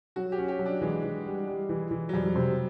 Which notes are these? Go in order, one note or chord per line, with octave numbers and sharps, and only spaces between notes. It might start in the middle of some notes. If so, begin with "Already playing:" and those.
F#3 F#4
G4
C#4
G4
F#3
D4
E3 G#3
E3
G3
G3
E3
E3
F#3
F2 G3
C3